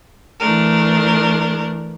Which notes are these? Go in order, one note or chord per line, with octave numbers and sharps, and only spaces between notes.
E3 A3 D4 A#4